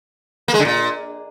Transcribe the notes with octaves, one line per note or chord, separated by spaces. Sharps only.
A#3
G#3
D3
A#2